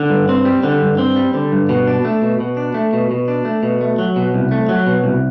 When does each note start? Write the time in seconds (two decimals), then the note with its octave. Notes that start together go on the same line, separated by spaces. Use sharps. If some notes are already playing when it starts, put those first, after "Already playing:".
Already playing: D3
0.10 G2
0.29 C4
0.45 G3
0.64 D3
0.82 G2
0.98 C4
1.16 G3
1.34 D3
1.52 G2
1.69 B2
1.88 D4
2.05 A3
2.22 B2
2.40 B2
2.57 D4
2.74 A3
2.93 B2
3.11 B2
3.28 D4
3.45 A3
3.63 B2
3.81 A3
3.99 F#3
4.16 B2
4.34 C2
4.51 A3
4.69 F#3
4.87 B2
5.04 C2